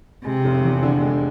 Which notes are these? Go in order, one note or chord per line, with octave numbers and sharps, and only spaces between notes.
C3 G#3
F1
E2
D3
G#3